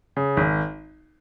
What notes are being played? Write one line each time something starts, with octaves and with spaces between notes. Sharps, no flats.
C#3
G#1